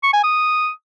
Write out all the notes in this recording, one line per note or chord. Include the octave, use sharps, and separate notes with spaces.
C#6
G#5
D#6